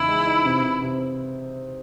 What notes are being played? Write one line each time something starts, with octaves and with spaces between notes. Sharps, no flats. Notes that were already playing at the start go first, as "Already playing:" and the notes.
Already playing: E2 C#3 D#4 E4
G#3
D#4
C3
C3
C3